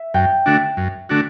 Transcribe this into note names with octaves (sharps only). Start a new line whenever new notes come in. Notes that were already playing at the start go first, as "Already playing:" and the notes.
Already playing: E5
F#2 G5
D3 A3 D4 F#4
F#2
D3 A3 D4 F#4